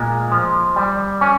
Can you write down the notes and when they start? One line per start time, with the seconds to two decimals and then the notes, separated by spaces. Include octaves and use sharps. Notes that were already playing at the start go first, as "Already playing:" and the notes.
Already playing: A#2 G#3
0.32 F3
0.76 G3
1.21 C#4